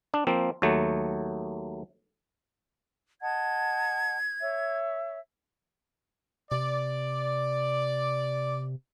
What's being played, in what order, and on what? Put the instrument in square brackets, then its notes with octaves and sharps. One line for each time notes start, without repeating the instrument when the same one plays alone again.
[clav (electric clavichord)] D4
F3 A#3 C4
D#2 F#3 A3
[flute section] D#5 F#5 A5 [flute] G#6
[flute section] C#5 E5
[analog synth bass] C3 [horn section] D5